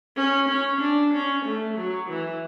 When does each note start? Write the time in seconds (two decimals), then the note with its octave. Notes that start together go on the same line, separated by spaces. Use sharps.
0.16 C#4
0.49 C#4
0.81 D4
1.13 C#4
1.45 A3
1.77 F#3
2.09 E3